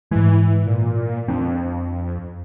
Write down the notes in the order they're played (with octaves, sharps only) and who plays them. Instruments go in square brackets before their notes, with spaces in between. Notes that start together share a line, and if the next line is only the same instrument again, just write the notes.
[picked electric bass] G#2 G#3 [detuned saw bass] E3
[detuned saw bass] A#2
[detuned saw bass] F2 [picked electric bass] C4 D4